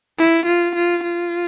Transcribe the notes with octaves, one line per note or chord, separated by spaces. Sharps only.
E4
F4
F4
F4